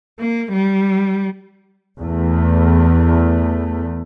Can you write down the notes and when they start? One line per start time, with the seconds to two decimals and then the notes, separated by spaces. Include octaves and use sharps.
0.20 A#3
0.53 G3
1.99 E2 A3